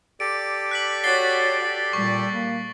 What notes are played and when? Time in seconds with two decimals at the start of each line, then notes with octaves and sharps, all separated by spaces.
0.20 G4 A4 D5 D7
0.71 F#6 B6 F#7
1.04 F#4 C#5 A6 C7 G7
1.93 A#2 G3 C#6
2.32 A#3